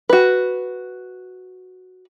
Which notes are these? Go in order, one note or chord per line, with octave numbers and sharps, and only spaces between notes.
F#4 B4